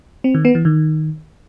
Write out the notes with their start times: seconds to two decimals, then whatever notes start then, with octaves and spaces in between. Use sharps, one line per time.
0.24 C4
0.34 D#3
0.45 B3
0.55 E3
0.65 D#3